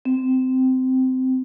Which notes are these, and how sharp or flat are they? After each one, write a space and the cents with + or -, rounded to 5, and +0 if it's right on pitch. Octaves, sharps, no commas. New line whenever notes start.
C4 -15